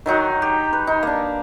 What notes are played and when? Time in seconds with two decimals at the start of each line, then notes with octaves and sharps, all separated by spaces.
0.06 D#3 F#3 D#4 F#4
0.42 G4
0.73 B4
0.87 D#4
1.03 A#3 D4